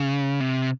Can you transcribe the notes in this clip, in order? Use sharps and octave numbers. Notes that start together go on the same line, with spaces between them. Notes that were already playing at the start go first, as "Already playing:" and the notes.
Already playing: C#3
C3